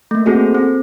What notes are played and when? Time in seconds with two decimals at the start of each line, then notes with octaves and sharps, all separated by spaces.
0.11 A3 A#3
0.26 C4 F#4 G#4 A4
0.55 C4